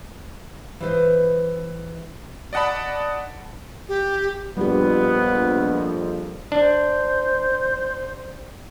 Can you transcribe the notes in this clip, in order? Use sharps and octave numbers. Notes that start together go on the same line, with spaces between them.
E3 B4 C5 D#5
D5 D#5 F#5 A5 B5
G4
A#1 F2 G3 B3 G4
D4 C5